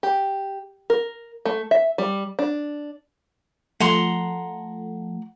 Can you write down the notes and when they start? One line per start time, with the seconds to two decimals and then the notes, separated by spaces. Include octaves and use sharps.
0.03 G4
0.90 A#4
1.45 A3
1.71 E5
1.98 G3
2.39 D4
3.80 F3 A3 F#5 A#5 C6